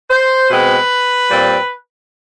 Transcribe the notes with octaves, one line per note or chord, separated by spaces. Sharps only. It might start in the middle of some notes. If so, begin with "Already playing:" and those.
C5
B2 G#3 C4 B4
A#2 G3 C4